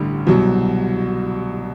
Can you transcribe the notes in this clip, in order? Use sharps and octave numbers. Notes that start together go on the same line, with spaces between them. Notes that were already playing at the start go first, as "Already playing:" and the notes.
Already playing: A1 G2 D3 G3
C2 B2 F#3